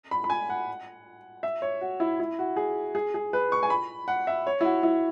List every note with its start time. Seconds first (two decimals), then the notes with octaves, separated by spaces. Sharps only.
0.11 B5
0.24 B5
0.30 G#5
0.50 F#5
1.43 E5
1.62 C#5
1.81 F#4
2.00 E4
2.20 E4
2.39 F#4
2.56 G#4
2.95 G#4
3.14 G#4
3.33 B4
3.52 C#6
3.63 G#5
3.70 B5
4.08 F#5
4.27 E5
4.47 C#5
4.61 E4
4.65 F#4
4.83 E4